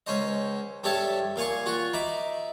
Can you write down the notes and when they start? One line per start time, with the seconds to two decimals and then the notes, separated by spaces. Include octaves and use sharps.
0.07 C#2 C#4 C5 D#5
0.84 G2 G4 A4 C#5 E5 A5
1.36 A#2 F5 G#5 C#6
1.66 F4 F#4 C#6
1.93 D#4 E5 B5 D6